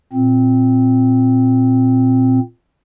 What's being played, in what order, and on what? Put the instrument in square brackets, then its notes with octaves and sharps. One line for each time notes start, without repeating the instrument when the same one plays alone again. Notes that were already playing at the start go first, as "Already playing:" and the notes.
[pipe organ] A#2 C4